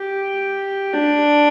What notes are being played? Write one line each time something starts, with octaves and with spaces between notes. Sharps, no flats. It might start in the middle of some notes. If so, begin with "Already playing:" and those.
Already playing: G4
D4